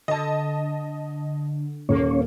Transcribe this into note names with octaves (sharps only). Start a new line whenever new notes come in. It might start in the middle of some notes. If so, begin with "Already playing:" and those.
D3 D#5 A5
D#1 A#3 C#4 A4 C#5